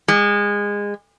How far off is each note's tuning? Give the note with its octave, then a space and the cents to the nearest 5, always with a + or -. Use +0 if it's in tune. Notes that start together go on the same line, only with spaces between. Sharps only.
G#3 -25